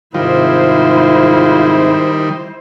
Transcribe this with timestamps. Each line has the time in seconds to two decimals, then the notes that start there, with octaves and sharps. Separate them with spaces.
0.14 G#2 C3 D#3 G3 E4 F4 C5